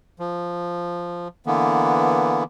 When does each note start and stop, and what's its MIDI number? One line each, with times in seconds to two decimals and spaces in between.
0.19 1.28 53
1.46 2.44 50
1.46 2.44 52
1.46 2.44 58
1.46 2.44 59